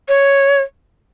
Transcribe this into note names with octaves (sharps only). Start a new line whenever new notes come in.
C#5